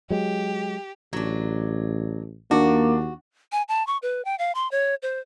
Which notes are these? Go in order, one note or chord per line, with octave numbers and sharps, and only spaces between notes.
F#3 G#3 G4
A1 F#3 D4
D#2 A#3 D4 F#4
G#5
A5
C#6
B4
G5
F5
C6
C#5
C5